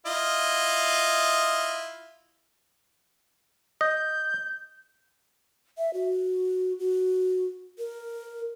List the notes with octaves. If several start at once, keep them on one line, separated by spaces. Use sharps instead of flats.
E4 F4 D#5
D#5 G6
E5
F#4
F#4
A#4